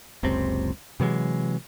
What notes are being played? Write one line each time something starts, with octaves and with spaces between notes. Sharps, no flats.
F#1 C#2 C3 C4
C3 E3 F#3 G#3